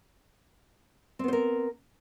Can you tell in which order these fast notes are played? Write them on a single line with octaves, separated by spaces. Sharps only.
C4 B3 C5 A#4